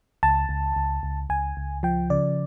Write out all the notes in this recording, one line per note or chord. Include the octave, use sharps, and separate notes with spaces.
C#2 A5
C#2
C#2
C#2
C#2 G#5
C#2
F3 G5
C#3 D5